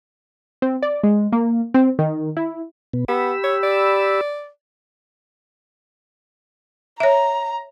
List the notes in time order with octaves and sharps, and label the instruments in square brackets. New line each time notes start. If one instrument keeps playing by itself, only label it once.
[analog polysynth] C4
D5
G#3
A#3
C4
D#3
E4
[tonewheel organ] B2 B3
[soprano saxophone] B3 [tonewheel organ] G4 B5 E6
[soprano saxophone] C#5
D5
[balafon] C#5 E5 [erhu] A#5